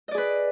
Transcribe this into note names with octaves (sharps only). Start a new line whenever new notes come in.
G#4 B4 D5 D#5